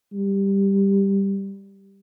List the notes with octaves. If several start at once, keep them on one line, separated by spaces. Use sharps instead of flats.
G3